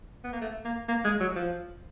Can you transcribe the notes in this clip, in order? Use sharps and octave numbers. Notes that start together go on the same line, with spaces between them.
B3
A#3
A3
A#3
A#3
G#3
F#3
F3